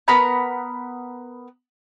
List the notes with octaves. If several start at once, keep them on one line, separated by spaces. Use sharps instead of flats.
B3 A#4 B5 F#6